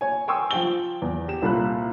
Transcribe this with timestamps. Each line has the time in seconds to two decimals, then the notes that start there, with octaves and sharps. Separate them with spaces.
0.01 C#5 G#5
0.28 G5 G#5 C6 C#6 D#6 E6
0.51 F3 G5 G7
1.02 E2
1.28 G4 E7
1.42 C2 A#2 A4 B5 F#6